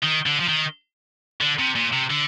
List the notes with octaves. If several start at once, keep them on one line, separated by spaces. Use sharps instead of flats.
D#3
D3
F3
D#3
D3
C3
A#2
C3
D3